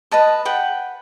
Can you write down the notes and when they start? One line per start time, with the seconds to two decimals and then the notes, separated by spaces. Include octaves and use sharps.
0.11 B4 D#5 A5 D#6
0.45 B4 F#5 G5